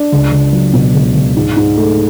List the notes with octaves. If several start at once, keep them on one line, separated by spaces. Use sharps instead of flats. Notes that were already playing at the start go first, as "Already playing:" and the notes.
Already playing: D4
C#2
C#2
F#3
B2
C#2
C#2
G#2
G#2
A3